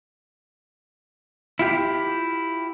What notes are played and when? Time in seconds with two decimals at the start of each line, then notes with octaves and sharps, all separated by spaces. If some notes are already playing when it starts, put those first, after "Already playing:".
1.59 E4 F4 G4